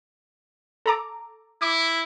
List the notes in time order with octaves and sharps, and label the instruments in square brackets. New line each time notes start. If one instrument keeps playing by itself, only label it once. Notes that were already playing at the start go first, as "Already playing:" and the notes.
[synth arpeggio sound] A4 A#5 D6
[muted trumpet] E4 [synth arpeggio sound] D6